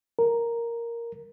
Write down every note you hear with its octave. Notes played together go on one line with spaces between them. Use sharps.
A#4